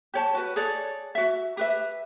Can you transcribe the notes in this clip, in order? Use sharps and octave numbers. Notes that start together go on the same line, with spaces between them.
G4 C#5 A5
F#4 B4
G#4 A4 C#5 D5
F#4 E5
G4 B4 E5